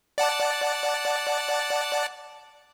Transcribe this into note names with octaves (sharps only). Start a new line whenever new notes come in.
D5 F#5 A5